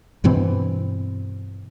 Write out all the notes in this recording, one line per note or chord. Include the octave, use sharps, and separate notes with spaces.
G2 B2 E3 C4